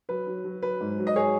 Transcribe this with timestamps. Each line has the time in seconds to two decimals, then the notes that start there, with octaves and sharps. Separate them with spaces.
0.09 F#3 B4
0.27 F#3
0.44 F#3
0.62 F#3 B4
0.81 G#2
0.98 F#3
1.07 D#5
1.16 G#4 C#5